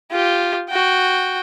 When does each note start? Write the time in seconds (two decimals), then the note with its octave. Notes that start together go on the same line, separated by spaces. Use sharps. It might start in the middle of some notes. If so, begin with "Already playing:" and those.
0.11 F4 G4
0.70 F#4 G5